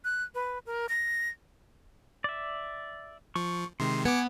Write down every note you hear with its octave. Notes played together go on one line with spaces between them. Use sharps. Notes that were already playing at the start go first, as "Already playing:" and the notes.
F#6
B4
A#4
A#6
D5 E5
F3 C#6
C3 D#3 G#3 C6
B3 G#5 D6 C#7